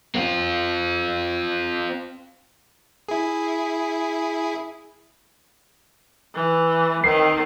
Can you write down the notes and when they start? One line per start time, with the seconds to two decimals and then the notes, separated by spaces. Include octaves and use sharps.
0.15 C4 F4
3.09 E4 G#4
6.34 E3
7.04 D#3 C4 C7